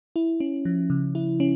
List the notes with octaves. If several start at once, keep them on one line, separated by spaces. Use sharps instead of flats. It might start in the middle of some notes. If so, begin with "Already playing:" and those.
E4
C#4
F3
C#3
E4
C#4